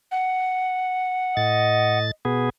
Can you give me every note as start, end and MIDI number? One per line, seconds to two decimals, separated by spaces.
0.12 1.98 78
1.37 2.11 45
1.37 2.10 75
1.37 2.11 93
2.25 2.50 47
2.25 2.50 59
2.25 2.50 68